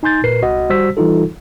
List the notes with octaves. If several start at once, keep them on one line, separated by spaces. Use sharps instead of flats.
D#4 G#5 C6 G6 A6
A#2 A#4 B4 C7
C2 F#4 D#5 F#5
G3 F#4 C5 E6 B6
E3 G3 D#4 F4 A4